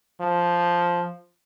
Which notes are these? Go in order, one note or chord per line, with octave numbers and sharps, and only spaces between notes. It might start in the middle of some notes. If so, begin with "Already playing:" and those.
F3